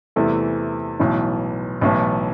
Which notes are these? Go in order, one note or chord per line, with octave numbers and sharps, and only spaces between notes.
E2 C3 E3 A3
B1 A2 E3
B1 A2 E3